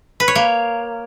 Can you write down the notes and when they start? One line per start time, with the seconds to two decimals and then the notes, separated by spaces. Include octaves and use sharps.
0.20 B4
0.28 C#5
0.35 A#3